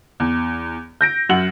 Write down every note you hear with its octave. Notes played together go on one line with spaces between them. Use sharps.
E2
G6 A#6 D7
F#2 F#5 F#7